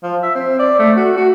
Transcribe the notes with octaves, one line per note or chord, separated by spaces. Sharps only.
F3
E5
C4
D5
A3
F#4
F#4